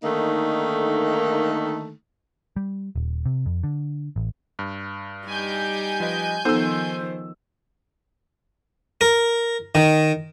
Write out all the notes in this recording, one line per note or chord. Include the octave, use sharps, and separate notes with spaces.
D3 D#3 A3 A#3 D#4
G3
D#1
C3
F2
D3
A1
G2
G3 D#4 G4 G#5 G6
F3 B4 D#5
D#3 F3 B3 D#4 A4 C5 E6
A#4
D#3